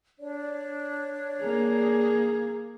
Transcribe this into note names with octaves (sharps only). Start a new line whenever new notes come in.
D4 C#5 D5
A#3 G#4